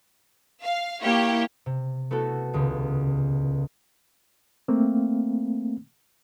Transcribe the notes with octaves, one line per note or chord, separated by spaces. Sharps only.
F5
A#3 E4 G4 C#5
C3
A3 B3 E4 F#4 A4
D#1 C#2 C#3
A3 A#3 C4